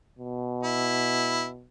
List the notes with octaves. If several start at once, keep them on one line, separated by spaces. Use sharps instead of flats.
B2
E4